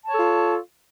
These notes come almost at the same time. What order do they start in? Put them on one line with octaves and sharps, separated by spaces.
A5 C#5 A4 F4